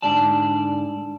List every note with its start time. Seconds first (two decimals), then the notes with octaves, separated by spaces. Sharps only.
0.02 G#2 D3 D5 A5